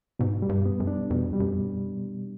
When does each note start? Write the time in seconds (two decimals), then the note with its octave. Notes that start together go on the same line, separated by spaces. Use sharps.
0.19 G#2 B2
0.42 G3
0.49 G2
0.66 B3
0.80 F#2
0.87 D4
1.10 F2 B2
1.33 G3
1.40 F#2